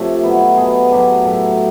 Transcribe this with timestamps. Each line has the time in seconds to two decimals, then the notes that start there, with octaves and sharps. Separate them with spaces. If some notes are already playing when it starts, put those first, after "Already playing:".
Already playing: C3 F3 A3 C#5
0.23 B2 F#3 B3 B4
0.57 B2 F#3 B3 G#4
0.91 A2 F#3 A3 G4
1.25 A2 F#3 A3